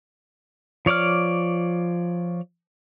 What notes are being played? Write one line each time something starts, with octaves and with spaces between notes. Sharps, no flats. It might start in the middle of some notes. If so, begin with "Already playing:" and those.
F3 C#5 D5 D6 F6